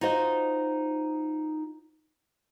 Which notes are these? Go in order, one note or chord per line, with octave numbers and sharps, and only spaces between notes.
D#4 F4 F#4 C5 D#5